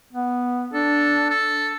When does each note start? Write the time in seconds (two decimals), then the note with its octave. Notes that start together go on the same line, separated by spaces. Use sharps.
0.13 B3
0.73 D4 A4
1.30 A4